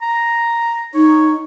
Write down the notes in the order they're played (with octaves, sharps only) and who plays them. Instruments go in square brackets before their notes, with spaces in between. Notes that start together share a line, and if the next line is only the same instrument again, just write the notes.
[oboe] A#5
[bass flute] D#4 [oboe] C#5